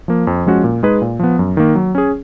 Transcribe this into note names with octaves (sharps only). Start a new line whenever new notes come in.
F3 A#3
F2
F3 G#3 C#4 F#4
A#2
G#3 D#4 G#4 B4
A#2
F3 B3
F#2
D#3 A#3
F#3
C#4 G#4